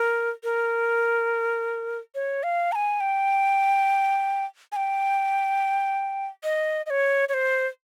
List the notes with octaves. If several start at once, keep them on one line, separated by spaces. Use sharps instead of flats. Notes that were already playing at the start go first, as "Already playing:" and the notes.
Already playing: A#4
A#4
C#5
F5
A#5
G#5
G5
G#5
G5
D#5
D#5
C#5
C#5
C5